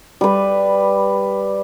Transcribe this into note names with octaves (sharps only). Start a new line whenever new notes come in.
G3 B4